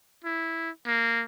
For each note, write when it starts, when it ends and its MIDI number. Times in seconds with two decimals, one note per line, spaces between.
0.25 0.70 64
0.87 1.23 58